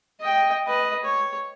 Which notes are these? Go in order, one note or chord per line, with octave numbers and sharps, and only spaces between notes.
D#5 G5
B4 D#5
C#5